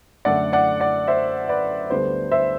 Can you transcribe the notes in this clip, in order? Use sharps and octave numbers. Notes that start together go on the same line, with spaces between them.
F#2 D3 A3 D5 F#5
D5 F#5
D5 F#5
C5 E5
B4 D5
D2 D3 G3 B3 C5
C5 E5